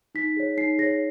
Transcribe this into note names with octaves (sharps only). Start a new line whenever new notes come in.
D#4 B6
G#4 C#5
D#4 C7
G#4 C#5 A#6